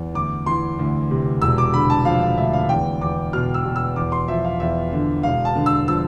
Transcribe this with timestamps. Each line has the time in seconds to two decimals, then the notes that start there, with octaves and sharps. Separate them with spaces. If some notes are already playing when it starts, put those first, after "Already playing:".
Already playing: E2
0.14 D2 D6
0.46 E3 C6
0.79 D2
1.11 C3
1.42 E1 E6
1.58 D6
1.73 D3 B5
1.90 A5
2.05 F3 F5
2.22 F5
2.38 D2 E5
2.53 F5
2.69 E2 G5
3.01 E2 D6
3.33 B2 F6
3.54 E6
3.65 B2
3.76 E6
3.96 E2 D6
4.12 C6
4.28 F3 E5
4.45 F5
4.60 E2 E5
4.93 D3
5.23 E1 F5
5.45 A5
5.55 D3
5.66 E6
5.88 F3 E6